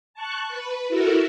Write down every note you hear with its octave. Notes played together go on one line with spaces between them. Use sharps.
A5 C#6 F#6
B4
E4 F#4 A4 A#4